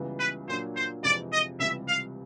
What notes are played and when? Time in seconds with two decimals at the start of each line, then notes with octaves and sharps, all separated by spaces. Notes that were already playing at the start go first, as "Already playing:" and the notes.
Already playing: C#2 C#3 E3 G3 B3
0.19 B4
0.47 A#2 F#3 A#3 D4 C5
0.76 C5
1.03 F2 C3 E3 G#3 D5
1.32 D#5
1.60 C#2 C3 E3 G3 E5
1.88 F5